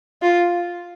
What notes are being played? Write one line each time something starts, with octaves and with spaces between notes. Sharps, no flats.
F4